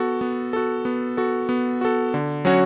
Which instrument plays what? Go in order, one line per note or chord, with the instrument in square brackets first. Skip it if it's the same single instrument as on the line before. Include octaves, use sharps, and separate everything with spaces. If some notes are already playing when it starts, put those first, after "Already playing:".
Already playing: [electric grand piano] B3 F#4 A4
B3
F#4 A4
B3
F#4 A4
B3
F#4 A4
D3
F#3 C#4 F#4 C#5